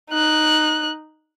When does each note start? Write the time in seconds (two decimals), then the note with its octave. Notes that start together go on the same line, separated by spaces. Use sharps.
0.10 D#4 F#6